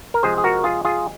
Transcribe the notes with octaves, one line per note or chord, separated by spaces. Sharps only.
A#4
C3 F3 G#3 G#4 C5
G#4
F#4 A#4
F4 G#4
F4 G#4